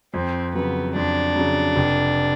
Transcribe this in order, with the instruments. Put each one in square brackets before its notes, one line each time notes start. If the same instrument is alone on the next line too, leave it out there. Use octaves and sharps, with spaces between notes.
[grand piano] F2 [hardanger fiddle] C4
[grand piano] C#3 F#3 [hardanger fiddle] B3
[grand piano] F2 [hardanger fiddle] D4
[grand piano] C#3 F#3
F1